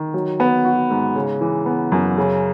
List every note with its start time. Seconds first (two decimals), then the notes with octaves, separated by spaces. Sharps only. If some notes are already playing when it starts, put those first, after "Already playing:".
Already playing: D#3
0.14 F#3
0.40 B3
0.64 F#4
0.90 G#2
1.15 C#3
1.41 E3
1.66 B3
1.92 F#2
2.18 C#3